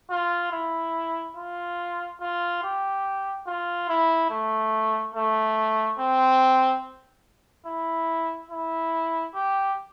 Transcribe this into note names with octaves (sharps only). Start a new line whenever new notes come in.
F4
E4
F4
F4
G4
F4
E4
A3
A3
C4
E4
E4
G4